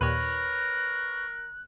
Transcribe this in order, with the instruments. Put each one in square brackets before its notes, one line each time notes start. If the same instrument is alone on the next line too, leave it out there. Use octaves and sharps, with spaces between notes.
[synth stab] D#2 A#2 [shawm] A#4 [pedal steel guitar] B4 C#5 [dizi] F#6